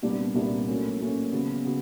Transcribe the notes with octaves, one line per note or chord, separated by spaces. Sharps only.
C2 A#2 G3 B3 D4
C2 A#2 G3 B3 D4
A2 F#3 A#3 C#4
A2 F#3 A#3 C#4
C#3 F#3 B3
C#3 F#3 B3